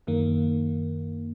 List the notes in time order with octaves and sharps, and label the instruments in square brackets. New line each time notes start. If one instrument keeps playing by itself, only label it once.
[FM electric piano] F#2 D#3 A#3